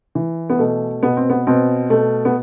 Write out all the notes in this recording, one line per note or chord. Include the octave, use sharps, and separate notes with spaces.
E3
B3
B2 A3
B2 B3
C4
B3
B2 C4
B2 A3
B3